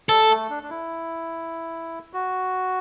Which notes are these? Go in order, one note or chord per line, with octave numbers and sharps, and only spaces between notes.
G3 A4
A3
D4
D4
E4
F#4